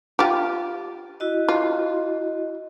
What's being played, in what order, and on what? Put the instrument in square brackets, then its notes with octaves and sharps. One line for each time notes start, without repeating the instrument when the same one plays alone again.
[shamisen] F4 G4
[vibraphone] E4 F#4 D#5
[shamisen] F4